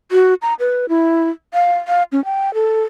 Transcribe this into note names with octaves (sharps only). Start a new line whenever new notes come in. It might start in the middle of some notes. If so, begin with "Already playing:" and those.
F#4
A#5
B4
E4
F5
F5
C#4
G5
A4